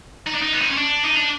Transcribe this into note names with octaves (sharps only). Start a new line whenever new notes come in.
D#4
D4
D#4
B3
C4
C#4
D4
D#4
D4